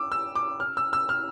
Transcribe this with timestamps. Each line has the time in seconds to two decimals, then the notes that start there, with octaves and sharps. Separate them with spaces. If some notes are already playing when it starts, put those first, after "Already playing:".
Already playing: D6 E6
0.12 E6
0.35 D6
0.60 F6
0.77 E6
0.93 E6
1.09 F6